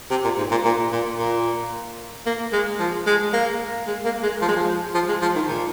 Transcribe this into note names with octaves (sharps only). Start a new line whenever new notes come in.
C3
A#2
G#2
A#2
A#2
A#2
A#2
A#3
G#3
F3
G#3
A#3
G#3
A#3
G#3
F3
G#3
F3
F3
G#3
F3
D#3
A#2